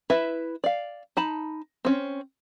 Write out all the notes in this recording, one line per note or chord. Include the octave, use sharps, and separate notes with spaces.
E4 B4 E5
D5 F5
D#4 A5 B5
C4 C#4